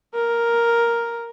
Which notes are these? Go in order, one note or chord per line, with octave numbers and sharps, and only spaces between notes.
A#4